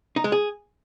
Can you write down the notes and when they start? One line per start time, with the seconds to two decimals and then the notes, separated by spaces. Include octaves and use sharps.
0.16 D#4
0.24 G#3
0.32 G#4